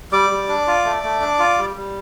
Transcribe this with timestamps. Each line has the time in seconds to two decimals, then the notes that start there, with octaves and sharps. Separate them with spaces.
0.12 G3 D5 D6
0.30 G3
0.49 D4
0.67 F4
0.84 A3
1.03 A3
1.21 D4
1.39 F4
1.58 G3
1.76 G3